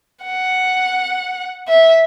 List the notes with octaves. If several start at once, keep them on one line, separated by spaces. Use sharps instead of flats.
F#5
E5